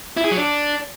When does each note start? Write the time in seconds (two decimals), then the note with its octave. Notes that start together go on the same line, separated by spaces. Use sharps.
0.17 E4
0.24 G#4
0.31 F#3
0.37 D4